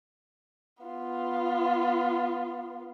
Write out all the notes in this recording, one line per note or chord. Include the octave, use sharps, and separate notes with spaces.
B3 F4